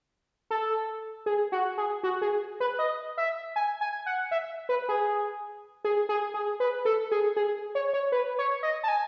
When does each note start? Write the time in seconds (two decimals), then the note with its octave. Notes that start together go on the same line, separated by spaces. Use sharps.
0.51 A4
1.26 G#4
1.52 F#4
1.78 G#4
2.03 F#4
2.22 G#4
2.60 B4
2.79 D#5
3.17 E5
3.56 G#5
3.81 G#5
4.06 F#5
4.31 E5
4.69 B4
4.89 G#4
5.84 G#4
6.09 G#4
6.34 G#4
6.60 B4
6.85 A4
7.12 G#4
7.36 G#4
7.75 C#5
7.93 C#5
8.12 B4
8.39 C#5
8.63 D#5
8.83 A5
8.88 G#5